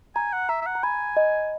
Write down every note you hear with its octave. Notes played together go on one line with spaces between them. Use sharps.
G#5 A#5
F#5
E5 A#5
E5
F#5
A#5
G#5 B5
D#5